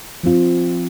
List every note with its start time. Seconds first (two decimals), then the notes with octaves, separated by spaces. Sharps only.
0.24 F3 C4 F4